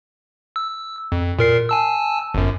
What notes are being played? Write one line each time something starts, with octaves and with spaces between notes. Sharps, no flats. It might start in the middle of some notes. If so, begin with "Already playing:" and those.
E6
F2
A#2 A#4 C7
G#5 A5 E6
G1 F#2